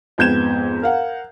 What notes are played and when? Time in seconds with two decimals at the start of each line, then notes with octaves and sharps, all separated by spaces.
0.18 F2 G#2 B3 G6 G#6 E7
0.82 A#4 F5 F#5